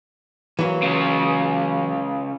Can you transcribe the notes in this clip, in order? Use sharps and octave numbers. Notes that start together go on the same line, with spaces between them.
E3 F#3 A#3
C#3 F4